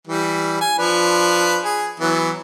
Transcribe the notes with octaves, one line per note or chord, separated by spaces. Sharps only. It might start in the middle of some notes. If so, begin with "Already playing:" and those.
E3 G3
G#5
F3 D4 B4
G#4
E3 F#3 B3